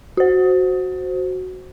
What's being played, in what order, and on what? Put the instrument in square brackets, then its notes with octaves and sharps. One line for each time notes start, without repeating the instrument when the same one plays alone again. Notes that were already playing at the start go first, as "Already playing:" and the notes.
[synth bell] F#4 C5